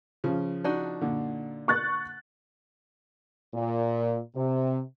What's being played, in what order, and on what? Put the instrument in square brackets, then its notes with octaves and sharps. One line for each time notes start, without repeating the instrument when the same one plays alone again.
[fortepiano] C#3 F3
[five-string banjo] D4 D#4 F#4
[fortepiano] A#2 D3
[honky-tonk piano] C#6 F#6 A6
[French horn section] A#2
C3